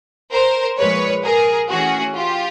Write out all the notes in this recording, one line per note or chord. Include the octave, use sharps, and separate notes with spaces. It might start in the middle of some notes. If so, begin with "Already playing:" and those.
A#4 C5
A#2 F3 G#3 B4 C#5
G#4 A#4
E3 A3 C#4 F#4 G#4
F4 G4